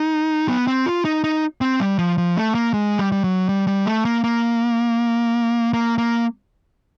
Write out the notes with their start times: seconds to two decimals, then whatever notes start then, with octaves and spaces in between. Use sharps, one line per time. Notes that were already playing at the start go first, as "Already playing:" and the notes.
Already playing: D#4
0.49 B3
0.67 C4
0.86 F4
1.05 D#4
1.24 D#4
1.61 C4
1.80 G3
1.99 F3
2.18 F3
2.36 A3
2.55 A#3
2.73 G#3
2.99 G3
3.12 G3
3.24 F#3
3.49 G3
3.67 G3
3.86 A3
4.05 A#3
4.24 A#3
5.73 A#3
5.98 A#3